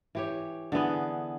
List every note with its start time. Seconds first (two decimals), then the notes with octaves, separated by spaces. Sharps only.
0.15 E3 G4 C#5
0.72 D3 E3 B3 G#4